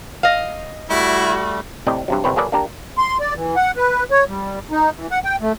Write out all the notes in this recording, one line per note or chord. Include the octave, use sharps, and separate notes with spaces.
D#5 F5
G3 A3 E4 F#4
A2 C3 C4 D5 D#5
G2 C3 F#3
G1 C2 C4 B4 C#5
F#3 A#3 G#4 A4 B4 D5
A#3 D4 G4 A#4
C6
D5
E3
F#5
B4
C#5
G3
D#4
E3
F#5
G5
A3